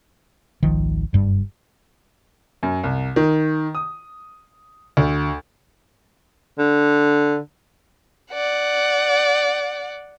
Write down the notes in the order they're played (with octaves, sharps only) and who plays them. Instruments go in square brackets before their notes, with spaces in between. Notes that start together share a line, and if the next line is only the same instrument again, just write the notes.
[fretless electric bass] G#1 C#2 D#3 F3
F#1 G2 G3
[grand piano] F#2
C2
D#3
D#6
D2
[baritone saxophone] D3
[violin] D5 F#5